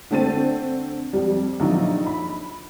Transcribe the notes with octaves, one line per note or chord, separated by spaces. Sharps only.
D3 A3 C4 A6 D#7
F2 G3
A#1 D#3 F#3 D#4 F4
B5